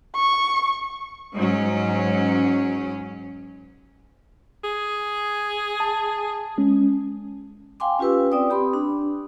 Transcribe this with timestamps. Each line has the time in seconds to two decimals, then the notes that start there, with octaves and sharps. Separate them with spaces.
0.16 C#6
1.34 G#2 F#3 C#4
4.64 G#4
5.80 A5
6.58 G#3 C#4
7.80 F5 G5 G#5 C6 D6
7.99 C#4 F4 G4 B4 E6
8.32 C4 D5 G5 D#6
8.50 G4 B5 C6
8.73 D4